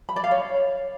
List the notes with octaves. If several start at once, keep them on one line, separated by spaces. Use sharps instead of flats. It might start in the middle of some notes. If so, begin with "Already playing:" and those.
B5
D5
F5
C#5